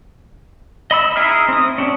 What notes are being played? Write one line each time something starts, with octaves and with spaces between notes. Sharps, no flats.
D#5 B5 E6
D#4 E4 G#4 E5 F6
C4 D#6
C#4 D4 G4